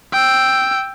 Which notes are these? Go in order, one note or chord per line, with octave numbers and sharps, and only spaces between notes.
G5 E6